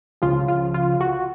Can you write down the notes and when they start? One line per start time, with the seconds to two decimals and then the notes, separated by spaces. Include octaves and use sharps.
0.22 C#2 C#3 F3 F4
0.48 F4
0.74 F4
1.01 F#4